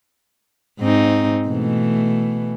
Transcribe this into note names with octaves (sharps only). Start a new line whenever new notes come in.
G#2 C4 D#4
B2 E3 A3